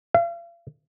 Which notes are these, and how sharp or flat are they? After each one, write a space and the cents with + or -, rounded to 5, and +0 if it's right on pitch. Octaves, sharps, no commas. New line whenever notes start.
F5 -40